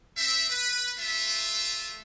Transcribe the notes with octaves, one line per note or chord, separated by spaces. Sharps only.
C4 E5
B4
A3 F4 E5